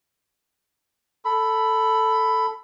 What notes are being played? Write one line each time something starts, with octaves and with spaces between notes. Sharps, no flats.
A4 B5